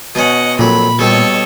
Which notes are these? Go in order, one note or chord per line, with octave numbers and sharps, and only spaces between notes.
B2 C#4 D#5 F#5
F2 A#2 F#3 B5
B2 G3 A4 C#5 D#5